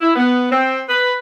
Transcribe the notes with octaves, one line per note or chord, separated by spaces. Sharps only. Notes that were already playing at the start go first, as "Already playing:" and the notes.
E4
B3
C4
B4